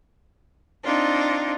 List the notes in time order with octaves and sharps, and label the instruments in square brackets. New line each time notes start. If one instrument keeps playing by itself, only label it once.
[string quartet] C4 D4 D#4 F4